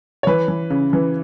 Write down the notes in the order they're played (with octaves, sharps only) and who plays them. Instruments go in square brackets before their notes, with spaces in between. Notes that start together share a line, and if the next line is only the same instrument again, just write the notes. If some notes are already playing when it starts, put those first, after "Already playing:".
[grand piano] C#5
E3 B4
E3
C#3
E3